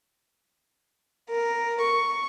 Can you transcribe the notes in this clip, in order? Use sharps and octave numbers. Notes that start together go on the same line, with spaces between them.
A#4
C#6